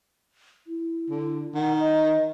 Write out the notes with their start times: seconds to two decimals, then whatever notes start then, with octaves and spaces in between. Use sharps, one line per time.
0.67 E4
1.10 D3
1.55 D#3 F#5
1.79 D#5